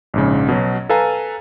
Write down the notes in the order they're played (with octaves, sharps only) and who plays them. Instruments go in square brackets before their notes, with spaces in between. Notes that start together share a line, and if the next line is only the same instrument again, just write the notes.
[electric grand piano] A#1 G#2 C#3
B2 F#3
A4 B4 F5 G#5 A#5